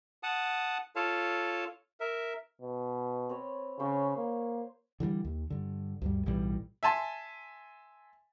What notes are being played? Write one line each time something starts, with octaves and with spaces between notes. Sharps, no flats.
F#5 A5 D#6
F4 A4 C#5 F5 A5
A#4 E5
B2
C4 B4 C#5
C#3 C5 C#5 G5
A#3
D3 E3 F3 G3
D#2
G2 D3
D2 G2 G3
B1 A2 E3 G3
E5 G#5 A5 C6